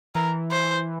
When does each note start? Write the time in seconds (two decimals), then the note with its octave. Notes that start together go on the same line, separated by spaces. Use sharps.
0.15 E3 A#4
0.51 C5